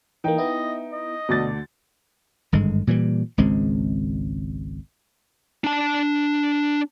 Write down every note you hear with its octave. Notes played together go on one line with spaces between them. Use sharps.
E3 A#3 D#4 G5
B3 E4 D#5
D#5
D2 B2 D3 D5 A6
G#1 G2 D3 G#3
A#2 E3 F3 G3
G#1 C#2 G#3 C4
D4 A5